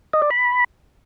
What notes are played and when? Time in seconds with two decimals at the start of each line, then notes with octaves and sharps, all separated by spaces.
0.13 D#5
0.22 D5
0.31 B5